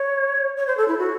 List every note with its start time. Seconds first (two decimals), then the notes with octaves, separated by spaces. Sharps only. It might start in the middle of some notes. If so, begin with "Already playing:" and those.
Already playing: C#5
0.57 C#5
0.67 C5
0.77 A4
0.88 E4
0.98 F#4